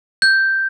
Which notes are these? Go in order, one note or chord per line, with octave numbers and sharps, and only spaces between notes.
G6